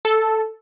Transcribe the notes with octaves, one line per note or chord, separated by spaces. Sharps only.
A4